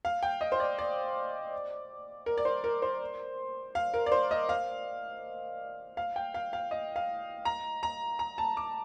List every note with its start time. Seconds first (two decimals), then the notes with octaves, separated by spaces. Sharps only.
0.05 F5
0.23 G5
0.41 D#5
0.52 C5
0.60 D5
0.78 D5
2.26 A#4
2.37 D5
2.45 C5
2.64 A#4
2.82 C5
3.75 F5
3.94 A#4
4.06 D5
4.12 C5
4.31 D#5
4.49 F5
5.97 F5
6.16 G5
6.34 F5
6.53 F5
6.71 D#5
6.96 F5
7.45 A#5
7.83 A#5
8.19 A#5
8.38 A5
8.57 D6